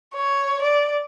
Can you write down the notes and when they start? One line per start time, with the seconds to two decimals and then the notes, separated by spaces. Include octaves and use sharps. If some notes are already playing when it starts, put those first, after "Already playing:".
0.15 C#5
0.62 D5